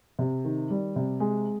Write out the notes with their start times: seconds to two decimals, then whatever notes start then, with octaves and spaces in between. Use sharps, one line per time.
0.19 C3
0.45 D#3
0.70 G3
0.96 C3
1.20 G#3